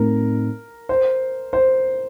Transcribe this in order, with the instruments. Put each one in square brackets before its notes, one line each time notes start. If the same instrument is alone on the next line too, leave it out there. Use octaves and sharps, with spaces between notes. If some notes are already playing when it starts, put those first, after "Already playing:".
Already playing: [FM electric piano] A2 A3 C4 D#4 [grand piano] A#4
[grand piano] C5
C5